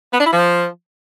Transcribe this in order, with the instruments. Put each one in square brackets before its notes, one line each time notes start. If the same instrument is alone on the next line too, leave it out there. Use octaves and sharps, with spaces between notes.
[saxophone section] B3
D4
E4
F3